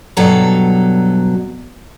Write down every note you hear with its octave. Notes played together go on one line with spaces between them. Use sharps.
G2 B2 F#3 A4 A#5